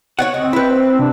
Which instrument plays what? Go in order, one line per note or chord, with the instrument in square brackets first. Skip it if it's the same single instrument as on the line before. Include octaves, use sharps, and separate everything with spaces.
[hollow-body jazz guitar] C#5 D5 F#5 [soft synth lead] C#6
[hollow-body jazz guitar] D2 [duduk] C4 [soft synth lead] D#5
[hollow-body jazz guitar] E4 B4 [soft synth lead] G5
[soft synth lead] C5
[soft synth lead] C3 [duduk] D4